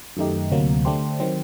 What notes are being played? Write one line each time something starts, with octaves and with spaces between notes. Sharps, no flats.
F#2 D#3 A3 D#4 G4
D2 C3 F#3 A#3
D3 A3 D4 G4 C5
D#3 F#3 C4